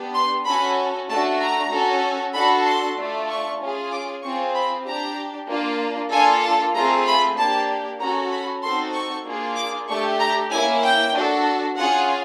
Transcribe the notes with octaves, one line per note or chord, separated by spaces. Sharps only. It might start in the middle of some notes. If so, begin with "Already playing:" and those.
Already playing: B3 D4 G4
C6
C#4 F#4 A4 B5
A3 D4 F#4 A5
A#5
C#4 F#4 A4
D4 F#4 A4 B5
C6
A3 D4 F4
C#6
C#4 F4 G#4
D6
C4 F4 G#4 C#6
B5
D4 G4 A#5
A#3 D4 F4
A#3 D4 F4 A4 G#5
A5
A3 C4 F4 G#4 A#5
B5
A#3 D4 G4 A5
C#4 F#4 A4 A#5
B5
C4 D#4 F#4 A4 C6
C#6
A#3 D4 F4 G#4
D6
A3 D4 G4 C#6
A#5
A#3 C#4 E4 G#5
G5
D4 F#4 A4
C#4 F4 G#4 F#5